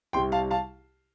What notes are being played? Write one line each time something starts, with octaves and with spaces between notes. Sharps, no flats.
C2 C3 G3 G5 C6
F5 A5
F5 A5